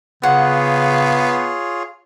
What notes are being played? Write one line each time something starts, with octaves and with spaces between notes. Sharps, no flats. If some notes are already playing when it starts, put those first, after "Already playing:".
C#3 B3 F4 G#4 C#5 F#5